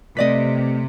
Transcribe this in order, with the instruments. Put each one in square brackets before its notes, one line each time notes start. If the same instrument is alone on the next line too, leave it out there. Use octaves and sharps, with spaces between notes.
[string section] C3 [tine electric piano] A3 B6 [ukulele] B4 D5 D#5